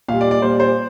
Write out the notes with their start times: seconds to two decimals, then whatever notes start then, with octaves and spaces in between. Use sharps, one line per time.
0.08 A#2 G3 F5
0.21 D5
0.31 D5
0.42 A#2 G3 C5
0.60 C5